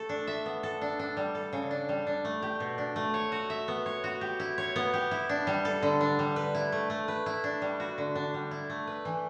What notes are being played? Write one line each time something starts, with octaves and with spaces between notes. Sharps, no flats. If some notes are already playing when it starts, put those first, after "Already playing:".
Already playing: A3 A4
D4
E5
B3
A4
D4
D4
G3
A4
C#3
D4
G3
D4
A3
G4
B2
D4
A3
C#5
F#4
E5
B3
C#5
F#4
G4
E4
C#5
B3
G4
E4
D4
G3
A4
D3
D4
G3
B4
E4
A3
A3
B4
E4
D4
G3
F#4
D3
D4
G3
E4
A3
B4
E3